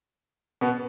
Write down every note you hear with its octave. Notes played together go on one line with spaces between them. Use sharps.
B2 B3